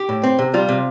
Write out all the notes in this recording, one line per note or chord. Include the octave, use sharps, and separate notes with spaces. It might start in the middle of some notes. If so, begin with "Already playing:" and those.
Already playing: G4
A2
C4
C3
G3 F4
C3